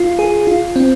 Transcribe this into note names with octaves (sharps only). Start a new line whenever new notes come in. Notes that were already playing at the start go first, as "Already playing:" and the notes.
Already playing: F4
G#4
F4
C4